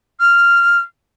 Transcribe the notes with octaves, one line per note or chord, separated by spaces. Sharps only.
F6